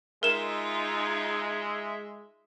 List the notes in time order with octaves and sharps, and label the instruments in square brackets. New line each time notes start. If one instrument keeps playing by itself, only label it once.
[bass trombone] G#3 [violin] D#4 F4 [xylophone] A#4 E7 [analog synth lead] E5